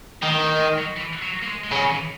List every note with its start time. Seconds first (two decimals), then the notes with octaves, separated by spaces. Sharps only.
0.22 D#3 A#3
0.41 A#3
0.59 G#3
0.78 F#3
0.97 E3
1.22 F#3
1.42 A#3
1.47 G#3
1.64 G#3
1.72 C#3 F#3
1.85 D#3
1.90 E3